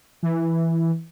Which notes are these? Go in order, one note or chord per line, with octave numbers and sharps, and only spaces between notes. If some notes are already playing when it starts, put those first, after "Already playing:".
E3